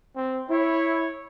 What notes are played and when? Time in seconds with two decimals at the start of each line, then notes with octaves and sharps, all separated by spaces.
0.16 C4
0.49 E4 C#5